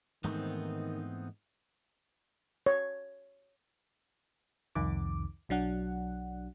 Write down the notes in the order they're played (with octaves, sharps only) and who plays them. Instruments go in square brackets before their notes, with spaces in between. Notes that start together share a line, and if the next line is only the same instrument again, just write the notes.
[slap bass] G#2 E3 A3 [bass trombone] D#3 [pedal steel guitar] B3 C4 D#4
[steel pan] C#5
[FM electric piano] C2 F2 D#3 D6
B1 F#3 D4 F#5